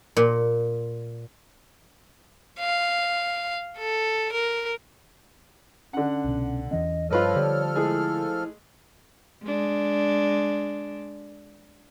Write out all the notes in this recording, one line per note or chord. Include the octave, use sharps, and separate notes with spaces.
A#2
F5
A4
A#4
D3 C#4 F#5
C2 B2
E2 E3 C#4 D#5
G2 F3 F4 A4 B4 C#5 D#5 F6
D3 G3
G#3 A3 E4 G#4
G#3 D4